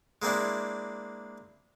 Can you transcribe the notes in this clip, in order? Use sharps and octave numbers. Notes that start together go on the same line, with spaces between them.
G#3 A#3 C4 D4 E4